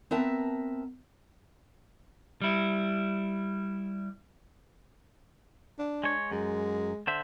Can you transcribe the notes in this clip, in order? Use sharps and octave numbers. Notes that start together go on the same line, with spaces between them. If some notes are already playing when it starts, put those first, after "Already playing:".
B3 C4 A#4 E5 A5
G3 E4
D4
G#3 C#5
F#2 G#3
D3 C5 E5